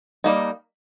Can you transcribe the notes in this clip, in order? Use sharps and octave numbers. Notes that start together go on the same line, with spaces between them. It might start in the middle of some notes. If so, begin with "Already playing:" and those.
G3 A#3 D#4